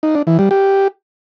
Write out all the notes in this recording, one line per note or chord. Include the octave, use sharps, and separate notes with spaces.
D#4
D4
E3
G3
G4